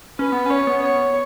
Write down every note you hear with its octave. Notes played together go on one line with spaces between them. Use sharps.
C#4 B4
B3
C#4 C#5
B3
C#5